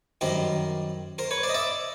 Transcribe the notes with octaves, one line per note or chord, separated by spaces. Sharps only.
F#2 D#3 G3 A#4 C5
A#4 C5
B4 C#5
C5 D5
D#5
D5 E5